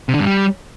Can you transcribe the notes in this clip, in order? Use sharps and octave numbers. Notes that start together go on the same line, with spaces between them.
C3
D3
G2
G3